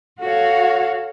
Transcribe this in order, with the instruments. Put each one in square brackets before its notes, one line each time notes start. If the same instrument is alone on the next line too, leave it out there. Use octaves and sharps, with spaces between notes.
[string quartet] F#4 A4 C#5 F5